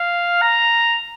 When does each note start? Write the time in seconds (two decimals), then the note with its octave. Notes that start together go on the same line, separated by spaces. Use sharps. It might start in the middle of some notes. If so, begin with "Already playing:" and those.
Already playing: F5
0.42 A#5